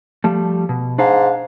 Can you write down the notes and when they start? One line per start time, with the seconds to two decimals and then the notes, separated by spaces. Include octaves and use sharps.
0.24 F3 G3 A3
0.69 B2
0.98 G#2 D4 F5